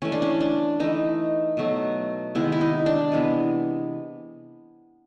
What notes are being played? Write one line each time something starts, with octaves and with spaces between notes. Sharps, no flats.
E3 A3 C#4
D4
C#4
D4
E3 A3 D#4
B2 F#3 A3
C3 D#3 G#3 B3 E4
E4
D#4
D4
C3 E3 G#3 B3